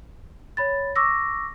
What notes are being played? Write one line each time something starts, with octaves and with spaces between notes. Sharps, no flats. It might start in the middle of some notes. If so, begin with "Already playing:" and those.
C#5 B5 A6
C#6 D6 E6 A#6